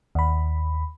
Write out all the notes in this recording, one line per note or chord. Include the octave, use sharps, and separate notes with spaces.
D#2 B5